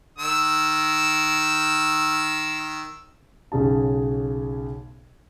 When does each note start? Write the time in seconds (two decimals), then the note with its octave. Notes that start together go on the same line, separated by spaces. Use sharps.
0.18 D#3 E6
3.52 B1 C#3 G#4 A5